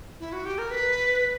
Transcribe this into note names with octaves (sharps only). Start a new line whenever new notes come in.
E4
F#4
G4
A#4
B4